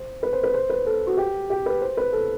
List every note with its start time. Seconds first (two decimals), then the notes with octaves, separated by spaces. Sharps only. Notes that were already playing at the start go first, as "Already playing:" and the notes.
Already playing: C5
0.23 B4
0.33 C5
0.43 B4
0.54 C5
0.70 B4
0.86 A4
1.07 F#4
1.17 G4
1.50 G4
1.66 B4
1.81 C5
1.97 B4
2.13 A4